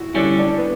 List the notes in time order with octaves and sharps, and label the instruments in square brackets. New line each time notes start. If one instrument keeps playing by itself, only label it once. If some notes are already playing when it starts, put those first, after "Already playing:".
Already playing: [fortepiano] E4 F#4
[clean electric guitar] D3 G3 C#4 [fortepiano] E4
[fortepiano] D4
B3